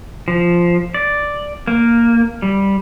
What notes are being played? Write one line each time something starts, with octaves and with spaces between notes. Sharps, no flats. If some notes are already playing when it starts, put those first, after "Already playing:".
F3
D5
A#3
G3